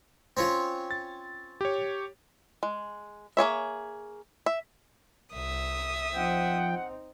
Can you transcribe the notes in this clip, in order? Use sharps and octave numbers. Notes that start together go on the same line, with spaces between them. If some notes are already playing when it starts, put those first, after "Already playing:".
C4 C#4 F4
A6
G4 C#5
G#3
A#3 G#4 C#5 E5
E5
C2 E5 D#6
F3 C4 D#4 F#5 G5